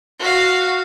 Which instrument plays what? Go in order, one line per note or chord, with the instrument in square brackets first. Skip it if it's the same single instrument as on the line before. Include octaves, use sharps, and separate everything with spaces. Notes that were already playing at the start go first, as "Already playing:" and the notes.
[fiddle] F#4 F5